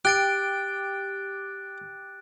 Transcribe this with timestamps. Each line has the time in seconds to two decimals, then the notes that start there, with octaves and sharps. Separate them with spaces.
0.05 G4 G5 F#6 A6 D7